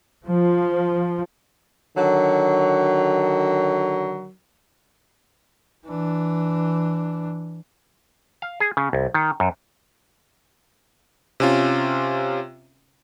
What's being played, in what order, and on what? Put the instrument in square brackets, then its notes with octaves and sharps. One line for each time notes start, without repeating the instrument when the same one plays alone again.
[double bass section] F3
[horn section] D3 D#3 F#3
[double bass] E3 D4
[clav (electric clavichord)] F5
G#4
C#3
C2
D#3
F#2
[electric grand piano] C3 C#4 F4